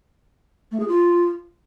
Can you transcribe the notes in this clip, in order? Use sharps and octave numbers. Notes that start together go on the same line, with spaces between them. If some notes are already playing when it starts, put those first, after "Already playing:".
A3
G#4
F4